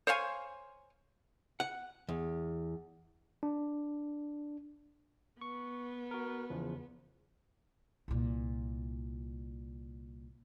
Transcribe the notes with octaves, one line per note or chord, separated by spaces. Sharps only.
C5 C#5 F5 G#5
F#5
E2
D4
B3 C#6
F#4 A#4
E2 C#3 F3
C2 A#2